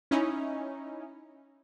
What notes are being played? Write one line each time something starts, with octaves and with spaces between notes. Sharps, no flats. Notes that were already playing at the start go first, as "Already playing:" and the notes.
C#4 D#4 E4